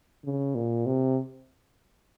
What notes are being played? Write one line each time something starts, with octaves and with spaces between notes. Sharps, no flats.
C#3
A#2
C3